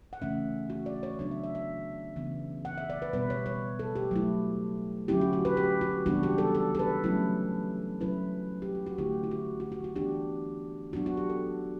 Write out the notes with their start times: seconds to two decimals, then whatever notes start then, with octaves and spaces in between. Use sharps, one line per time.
0.13 F#5
0.22 C#3 E3 A3 C#4 E5
0.70 F#4
0.86 D5
1.03 C#5
1.19 C#3 F#3 B3 D4 C#5
1.31 E5
1.44 E5
1.55 E5
2.16 C#3 E3 B3
2.65 F#5
2.78 E5
2.90 D5
3.02 B4
3.13 B2 G3 B3 B4
3.30 C#5
3.46 C#5
3.79 A4
3.96 G4
4.11 F#3 A3 E4
5.08 D3 F#3 C#4 E4 G4
5.21 F#4
5.33 F#4
5.45 B4
5.57 G4
5.81 F#4
6.06 C#3 E3 G3 B3 D4 F#4
6.23 G4
6.38 A4
6.55 A4
6.75 A4
6.79 B4
7.04 F#3 A3 C#4 E4
8.01 F#3 C#4 E4 B4
8.62 G4
8.75 F#4
8.86 F#4
8.98 D3 A3 E4 G4
9.24 E4
9.31 F#4
9.60 F#4
9.72 F#4
9.84 F#4
9.96 E3 B3 D4 G4
10.93 F#3 B3 D4 F#4
11.06 F#4
11.17 G4
11.30 A4